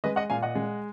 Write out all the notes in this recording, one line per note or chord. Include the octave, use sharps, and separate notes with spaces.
G#3 B4 D#5
D#5 F#5
A#2 F5 G#5
D#5 F#5
G#3